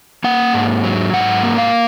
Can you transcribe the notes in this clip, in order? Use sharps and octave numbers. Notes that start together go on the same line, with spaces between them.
A#3 F#5
G#2
F#3
G#2 F#5
A#3
F5